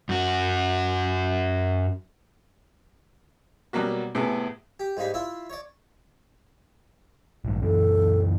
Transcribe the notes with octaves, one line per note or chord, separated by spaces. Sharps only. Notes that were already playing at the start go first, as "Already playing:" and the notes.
F#2 F#4
B2 F#3 G3 A#3 F#4
A2 C3 B3 G#4
G4
G#2 G3 A#3 D#4 B5
E4 F4 E5
C#5 D5
A#1 G#2
F#2 A#2 E3 A4